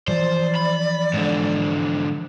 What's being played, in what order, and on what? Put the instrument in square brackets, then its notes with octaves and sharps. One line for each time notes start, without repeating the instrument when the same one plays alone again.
[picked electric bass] E3 F3 [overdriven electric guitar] C5 [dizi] D5
[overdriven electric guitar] B5
G#2 D3